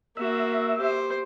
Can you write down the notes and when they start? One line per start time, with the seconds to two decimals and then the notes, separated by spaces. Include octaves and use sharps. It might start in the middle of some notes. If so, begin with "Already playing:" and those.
0.17 A#3 F#4 E5
0.77 G4 C5